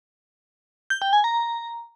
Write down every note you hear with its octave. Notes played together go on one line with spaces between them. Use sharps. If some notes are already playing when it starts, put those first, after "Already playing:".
G6
G5
G#5
A#5